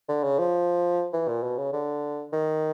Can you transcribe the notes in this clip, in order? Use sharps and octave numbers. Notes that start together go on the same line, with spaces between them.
D3
C#3
F3
E3
A#2
B2
C#3
D3
D#3